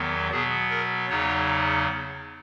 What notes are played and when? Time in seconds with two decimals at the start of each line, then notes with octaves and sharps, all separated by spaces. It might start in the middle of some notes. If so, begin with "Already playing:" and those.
Already playing: E2 D#3 F#3 B3
0.31 B2 F#3 B3 G#4
0.70 A#4
1.09 E2 C#3 F#3 B3 D#4 C#5